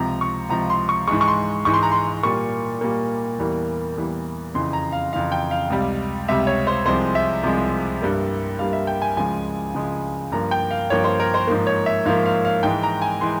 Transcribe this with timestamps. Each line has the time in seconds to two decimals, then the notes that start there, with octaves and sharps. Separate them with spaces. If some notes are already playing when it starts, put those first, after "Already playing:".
Already playing: C#2 C3 F3 A#5
0.21 C#6
0.49 C#2 C3 F3 A#5
0.70 C6
0.89 C#6
1.08 G#2 E3 G#3 C#6
1.21 C#6
1.28 C6
1.65 G#2 E3 G#3 C#6
1.74 C6
1.83 A#5
1.92 C6
2.23 A#2 G3 A#3 C#6
2.81 A#2 G3 A#3
3.38 E2 E3 G3 A#3
3.97 E2 E3 G3 A#3
4.54 F2 C#3 E3 C6
4.73 A#5
4.92 F5
5.13 F2 C#3 E3 F5
5.32 G5
5.51 F5
5.70 C#2 C3 G3
6.28 C#2 C3 G3 E5
6.47 C#5
6.67 C5
6.86 C2 C3 F3 G#3 C5
7.15 E5
7.43 C2 C3 F3 G#3
8.02 G2 G3 A#3
8.59 G2 G3 A#3 F5
8.73 E5
8.87 G5
9.02 G#5
9.17 C#2 C#3 F3 G#3 G#5
9.74 C#2 C#3 F3 G#3
10.32 G2 F3 A#3 A#5
10.51 G5
10.71 F5
10.90 G2 F3 A#3 C#5
11.04 C5
11.20 A#4
11.34 C5
11.47 G#2 F3 A#3
11.67 C#5
11.86 E5
12.05 G#2 F3 A#3 F5
12.26 F5
12.45 F5
12.63 G#2 E3 G#3 G5
12.83 A#5
13.02 G#5
13.21 E3 G#3 C6